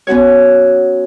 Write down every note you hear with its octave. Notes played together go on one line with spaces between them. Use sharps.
B3 C#4 F#4 C#5